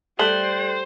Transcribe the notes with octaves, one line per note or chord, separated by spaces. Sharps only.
G3 A3 A4 C5 F#6 F#7